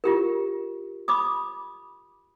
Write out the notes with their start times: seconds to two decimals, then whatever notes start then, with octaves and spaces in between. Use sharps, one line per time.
0.04 F4 G4 A#4
1.08 B5 D6 D#6